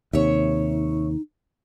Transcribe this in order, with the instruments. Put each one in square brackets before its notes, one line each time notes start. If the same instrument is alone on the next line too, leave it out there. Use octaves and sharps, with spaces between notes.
[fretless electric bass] D#2 C3 [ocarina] D#4 [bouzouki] C#5 E5